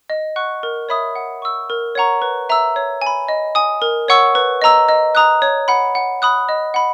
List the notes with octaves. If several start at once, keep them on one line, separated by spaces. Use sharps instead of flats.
D#5
F#5 C#6 F#6
A#4
C#5 E5 B5 D#6
F#5
C#6 E6
A#4
C#5 F#5 A#5 C#6
B4
E5 A#5 E6
C#5
G#5 B5
D#5
G#5 D#6
A#4
C#5 F#5 C#6 E6
B4
D#5 A#5 E6
D#5
A#5 D#6 F#6
C#5
F#5 B5
F#5
B5 D#6 F#6
D#5
F#5 B5